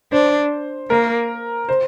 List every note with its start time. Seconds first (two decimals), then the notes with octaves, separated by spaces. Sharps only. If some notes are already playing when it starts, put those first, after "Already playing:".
0.12 D4 C5
0.90 A#3 A#4
1.69 C5